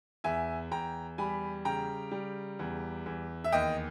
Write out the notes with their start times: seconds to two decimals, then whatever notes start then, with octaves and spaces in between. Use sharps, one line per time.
0.24 E2 E5 G#5
0.71 E2 G5 A#5
1.18 G3 G#5 B5
1.65 C#3 G5 A#5
2.12 G3
2.59 E2
3.06 E2
3.44 E5
3.52 D#2 D#5 G5